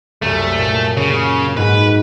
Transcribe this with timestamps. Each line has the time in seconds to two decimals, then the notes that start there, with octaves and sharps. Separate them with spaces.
0.22 C2 F#2 A3
0.57 A#2 A6 D#7
0.97 C#3
1.57 G#2 F#4 B4